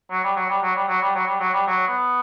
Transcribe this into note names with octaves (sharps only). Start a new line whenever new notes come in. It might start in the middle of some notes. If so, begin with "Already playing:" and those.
F#3
G3
F#3
G3
F#3
G3
F#3
G3
F#3
G3
F#3
G3
F#3
B3